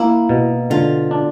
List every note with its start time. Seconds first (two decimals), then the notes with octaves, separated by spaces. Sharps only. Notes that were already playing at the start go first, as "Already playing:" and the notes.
Already playing: A#3 E4
0.29 B2
0.70 D3 F4
1.11 D4